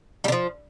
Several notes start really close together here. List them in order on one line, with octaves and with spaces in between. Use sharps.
G3 D3 F3